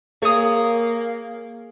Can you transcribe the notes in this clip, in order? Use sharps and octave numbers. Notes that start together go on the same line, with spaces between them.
A#3 G#4 C#5 D#6